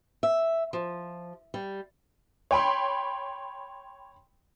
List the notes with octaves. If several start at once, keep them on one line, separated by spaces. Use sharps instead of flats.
E5
F3
G3
C#5 G5 B5 C6